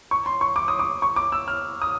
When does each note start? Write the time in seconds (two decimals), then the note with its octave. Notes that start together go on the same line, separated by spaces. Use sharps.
0.11 C#6
0.26 C6
0.41 C#6
0.56 D6
0.68 D#6
0.79 D6
1.02 C#6
1.16 D6
1.32 E6
1.48 F6
1.82 D#6